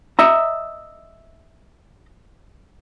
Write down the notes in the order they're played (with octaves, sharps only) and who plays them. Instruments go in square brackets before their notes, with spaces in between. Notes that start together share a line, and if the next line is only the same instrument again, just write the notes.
[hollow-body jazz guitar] D#5 E5 A#5